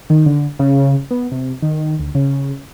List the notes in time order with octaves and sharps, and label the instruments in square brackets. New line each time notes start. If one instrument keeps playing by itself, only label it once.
[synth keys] D#3
D3
C#3
B3
C3
D#3
D2
C#3